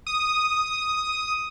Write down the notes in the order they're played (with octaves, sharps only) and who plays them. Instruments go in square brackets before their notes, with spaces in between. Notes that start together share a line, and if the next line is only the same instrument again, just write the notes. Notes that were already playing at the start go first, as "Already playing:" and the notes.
[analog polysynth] D#6